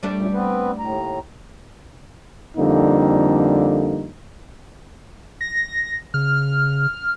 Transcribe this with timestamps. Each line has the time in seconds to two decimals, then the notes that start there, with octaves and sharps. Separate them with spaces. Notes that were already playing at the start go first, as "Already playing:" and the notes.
0.03 G3 A3 D4
0.16 F#2 A#2
0.34 B3 C4 B4
0.79 D#2 A2 A#5
2.56 F2 D3 G3 A#3 D#4
5.41 A#6
6.14 C#3 F6